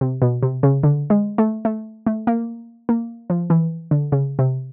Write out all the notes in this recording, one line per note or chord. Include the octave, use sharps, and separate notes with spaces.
C3
B2
C3
C#3
D3
G#3
A3
A3
A3
A#3
A#3
F3
E3
D3
C#3
C3